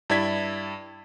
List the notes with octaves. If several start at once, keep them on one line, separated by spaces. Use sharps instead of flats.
G2 E4 D5 G#6 B6